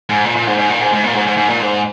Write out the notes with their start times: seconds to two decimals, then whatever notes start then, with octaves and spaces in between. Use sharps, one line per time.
0.10 G#2
0.25 A#2
0.36 A#2
0.47 G#2
0.58 G#2
0.70 A#2
0.81 G#2
0.93 G#2
1.04 A#2
1.16 G#2
1.27 G#2
1.38 G#2
1.50 A#2
1.61 G#2